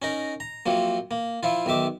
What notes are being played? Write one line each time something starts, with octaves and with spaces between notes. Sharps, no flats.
C#4 D#4 A#4
A#5
C3 F3 F#3 A#3
A#3
F3 E4 F4
B1 D#3 E5 D6